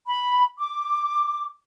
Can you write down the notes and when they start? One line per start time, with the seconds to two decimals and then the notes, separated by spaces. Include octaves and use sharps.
0.06 B5
0.58 D6